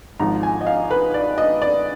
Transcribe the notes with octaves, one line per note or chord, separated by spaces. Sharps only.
G#1 G#2 F3 A#5
G#5
D#5
F5
B4
D5
D#5
D5